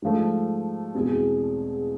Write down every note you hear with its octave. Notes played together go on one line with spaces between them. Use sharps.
G#2 F3 A3
E2 B2 G#3 C4